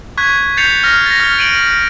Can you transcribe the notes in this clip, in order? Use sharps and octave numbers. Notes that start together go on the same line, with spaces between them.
C#6 F#6 G#6 B6
G6 A6 C7 C#7 F7
F6 A#6
A6 A#6
F6
D7 D#7 F#7